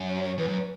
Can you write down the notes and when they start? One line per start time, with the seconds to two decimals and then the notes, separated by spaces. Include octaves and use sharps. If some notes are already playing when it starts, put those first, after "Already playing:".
Already playing: F#2
0.09 C#5
0.24 C#5
0.38 E2 B4
0.48 F#2